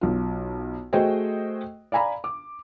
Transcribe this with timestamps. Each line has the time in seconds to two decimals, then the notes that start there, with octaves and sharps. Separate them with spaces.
0.01 B1 F4
0.93 A3 F#4 G#4 C5 D#5 G5
1.92 D5 F5 G#5 A#5 B5
2.24 D6